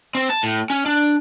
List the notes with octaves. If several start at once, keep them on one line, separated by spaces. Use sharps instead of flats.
C4
A5
A2
C#4
D4